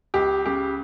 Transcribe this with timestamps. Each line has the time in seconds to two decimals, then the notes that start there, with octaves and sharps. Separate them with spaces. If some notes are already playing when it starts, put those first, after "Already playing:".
0.14 C#2 G4
0.45 C#3 G4